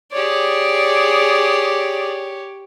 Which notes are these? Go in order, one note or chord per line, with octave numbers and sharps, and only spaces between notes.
G4 G#4 C#5 D5